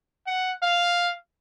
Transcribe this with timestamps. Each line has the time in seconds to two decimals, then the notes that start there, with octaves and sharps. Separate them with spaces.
0.27 F#5
0.63 F5